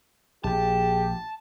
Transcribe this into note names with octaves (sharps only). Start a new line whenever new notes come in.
A#1 G4 G#4 A5